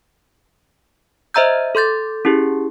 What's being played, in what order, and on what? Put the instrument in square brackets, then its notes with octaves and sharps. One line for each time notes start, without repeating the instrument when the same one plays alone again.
[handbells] C5 D#5 E5 A#5 E6 G6
A4 C6 G6 A6
C#4 E4 G4 G#4